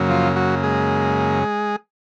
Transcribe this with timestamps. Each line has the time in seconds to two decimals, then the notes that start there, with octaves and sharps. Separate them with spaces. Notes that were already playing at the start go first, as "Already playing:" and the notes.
Already playing: F#2 C#3 F#3 A#3
0.09 F3 F4
0.36 F#3 F#4
0.63 G#3 G#4